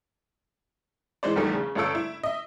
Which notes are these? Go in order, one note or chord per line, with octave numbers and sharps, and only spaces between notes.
E3 G#3 C5 D5
A#1 E2 D#3 F3 G3 A3
C#3
G1 C#4 F4 A4 E6 D7
E4
D#5 E5